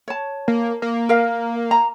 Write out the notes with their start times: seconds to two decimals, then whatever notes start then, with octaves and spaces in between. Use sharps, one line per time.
0.08 C#5 A5
0.48 A#3
0.82 A#3
1.09 A#4 F5
1.71 A#5